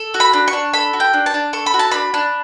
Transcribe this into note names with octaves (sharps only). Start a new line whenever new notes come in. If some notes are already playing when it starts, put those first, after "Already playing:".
Already playing: A4
F#4
B5
D4
C#6
D4
A4 B5
F#4
G5
D4
A5
D4
A4 C#6
B5
F#4
A5
D4 B5
D4